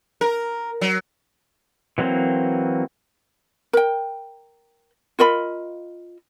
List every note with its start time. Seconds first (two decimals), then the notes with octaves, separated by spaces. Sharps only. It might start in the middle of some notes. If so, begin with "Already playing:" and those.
0.21 A#4
0.81 F#3
1.98 E3 F#3 A#3 C4
3.73 A#4 G5
5.19 F4 A#4 D#5 B5